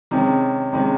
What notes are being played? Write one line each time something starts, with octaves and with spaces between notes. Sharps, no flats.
C3 D#3 G#3 C#4
C3 D#3 G#3 C#4